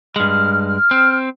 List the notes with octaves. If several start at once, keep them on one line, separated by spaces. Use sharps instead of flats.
G2 G#3 F6
F6
C4